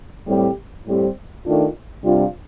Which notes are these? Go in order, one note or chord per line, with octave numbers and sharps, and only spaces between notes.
A2 G3 C4 G4
A2 G3 C4 G4
D#3 A3 D4 F4
C3 G3 D4 F4